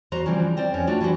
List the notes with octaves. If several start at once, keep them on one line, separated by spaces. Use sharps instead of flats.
E2 F#4 B4 C5 A#5
C#3 E3 F3 G3 C4
C4 C5 D5 G5
F2 C#4 D4
A3 D4 F4 F#4
E3 G3 D4 F#4 G4 C5